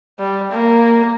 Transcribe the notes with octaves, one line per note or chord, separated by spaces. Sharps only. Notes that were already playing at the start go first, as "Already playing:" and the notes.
G3
A#3